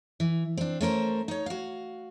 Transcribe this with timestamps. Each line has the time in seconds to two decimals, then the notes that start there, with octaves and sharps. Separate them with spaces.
0.20 E3
0.57 C4 D4
0.81 A3 C#4 A#4 C5
1.28 D#4 C#5
1.46 F#4 F5